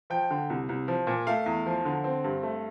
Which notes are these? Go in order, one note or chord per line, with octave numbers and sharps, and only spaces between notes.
F3 G5
D3
C2
C2
F3
A#2
A3 F5
E2
F3
D3
C4
G2
A3